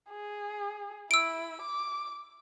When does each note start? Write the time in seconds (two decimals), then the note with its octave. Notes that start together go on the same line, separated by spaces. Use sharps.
0.10 G#4
1.11 E4 E6 D7
1.62 D6